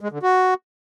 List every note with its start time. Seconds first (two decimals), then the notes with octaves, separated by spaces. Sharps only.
0.01 G#3
0.12 D3
0.23 F#4